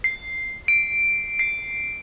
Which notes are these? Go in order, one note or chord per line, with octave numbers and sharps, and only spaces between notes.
C7
D7
C7